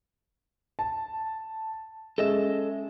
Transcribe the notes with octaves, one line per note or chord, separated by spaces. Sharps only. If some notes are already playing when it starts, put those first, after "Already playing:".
A5
G#3 C#4 A4 D#5 E5